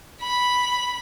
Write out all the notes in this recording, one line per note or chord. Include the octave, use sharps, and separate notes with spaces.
B5